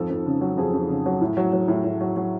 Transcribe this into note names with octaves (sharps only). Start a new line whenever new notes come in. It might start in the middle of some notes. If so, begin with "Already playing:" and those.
Already playing: F2 G#2 A4
F2
C#3
F#3
F2 G#4
F2
C#3
F#3
A2
F#3
F#3
A2
A2
F#3
F#3